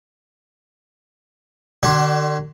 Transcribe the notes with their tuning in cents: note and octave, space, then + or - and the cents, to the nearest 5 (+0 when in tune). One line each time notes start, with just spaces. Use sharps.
D3 +40 D4 +0 F#4 +45